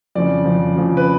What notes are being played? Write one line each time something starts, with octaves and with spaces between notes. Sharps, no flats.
F2 C#3 F3 D5
F2 C#3 F3
F2 C#3 F3
B4